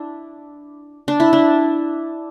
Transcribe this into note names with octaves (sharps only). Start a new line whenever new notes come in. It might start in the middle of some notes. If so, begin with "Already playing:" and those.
Already playing: D4 E4
D4
E4
D4